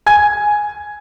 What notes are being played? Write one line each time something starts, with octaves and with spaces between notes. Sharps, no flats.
G#5 G#6